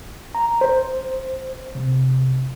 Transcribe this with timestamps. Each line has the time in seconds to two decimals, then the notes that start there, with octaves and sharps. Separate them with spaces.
0.35 A#5
0.61 C5
1.75 C3